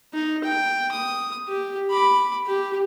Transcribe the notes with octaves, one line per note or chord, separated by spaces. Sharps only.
D#4
G5
D#6
G4
B5 D6
G4